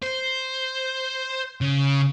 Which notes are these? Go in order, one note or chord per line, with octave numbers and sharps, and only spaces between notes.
C5
C#3